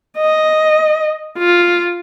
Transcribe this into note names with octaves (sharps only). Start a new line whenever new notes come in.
D#5
F4